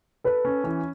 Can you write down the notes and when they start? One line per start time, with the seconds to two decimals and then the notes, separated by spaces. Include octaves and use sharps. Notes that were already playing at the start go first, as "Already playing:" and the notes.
0.24 A4 B4
0.45 C#4
0.64 E3